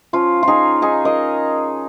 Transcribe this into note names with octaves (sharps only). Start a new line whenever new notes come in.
F3 C#4 F4
D#4 F4 G#4
D#4 G#4
A#4 D#5